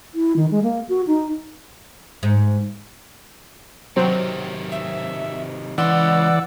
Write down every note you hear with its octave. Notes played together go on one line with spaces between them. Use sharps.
E4
D#3
G#3
A#3
F#4
D#4
G#2
C3 D#3 F#3 C4
E5
C#2 E3 D5 F#5 C6 E6